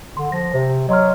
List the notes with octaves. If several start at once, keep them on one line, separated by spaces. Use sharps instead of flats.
D3 C6
F3 A#6
C3 C5
F#3 D#5 C6 F6